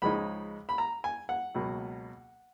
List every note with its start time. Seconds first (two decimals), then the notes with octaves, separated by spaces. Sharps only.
0.02 C#2 C#3 F3 G#3 D#4 B5
0.69 B5
0.78 A#5
1.04 G#5
1.29 F#5
1.55 C#2 B2 F#3 A#3